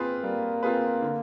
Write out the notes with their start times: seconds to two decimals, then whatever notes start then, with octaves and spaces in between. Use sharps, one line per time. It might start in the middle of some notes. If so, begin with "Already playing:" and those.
Already playing: C4 F4 G#4 B4
0.23 G3 A#3
0.63 C4 F4 G#4 B4
1.02 D3